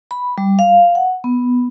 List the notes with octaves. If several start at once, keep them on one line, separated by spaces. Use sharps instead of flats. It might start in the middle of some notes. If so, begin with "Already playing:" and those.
B5
G3
F5
F#5
B3